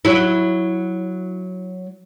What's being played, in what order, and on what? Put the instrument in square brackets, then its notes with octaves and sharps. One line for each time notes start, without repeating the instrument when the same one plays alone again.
[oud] F#3 E4